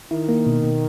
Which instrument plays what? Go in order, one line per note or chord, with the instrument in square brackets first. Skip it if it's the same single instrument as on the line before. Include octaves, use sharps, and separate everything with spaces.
[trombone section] D#3 [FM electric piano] E4
[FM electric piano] A#3
B2
B2